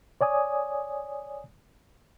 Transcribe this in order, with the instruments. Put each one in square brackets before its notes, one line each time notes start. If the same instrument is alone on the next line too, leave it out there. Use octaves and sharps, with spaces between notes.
[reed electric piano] C#5 D5 G#5 D#6